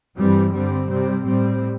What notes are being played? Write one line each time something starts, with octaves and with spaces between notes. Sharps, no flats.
G2 E3 G3 C4
G2 D3 G3 C4
C3 G3 C4
A2 G3 C4